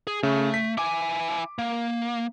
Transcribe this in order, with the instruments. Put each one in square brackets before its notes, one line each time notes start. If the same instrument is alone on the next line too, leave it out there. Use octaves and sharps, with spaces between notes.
[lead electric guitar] G#4
[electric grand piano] C#3 [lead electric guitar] A3
[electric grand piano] B6
[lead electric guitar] E4 G#5 [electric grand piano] D6
[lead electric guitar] A#3